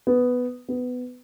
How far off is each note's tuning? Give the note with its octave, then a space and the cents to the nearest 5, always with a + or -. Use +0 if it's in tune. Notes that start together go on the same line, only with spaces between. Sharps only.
B3 +5
B3 +15